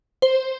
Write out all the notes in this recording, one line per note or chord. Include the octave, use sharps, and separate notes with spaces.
C5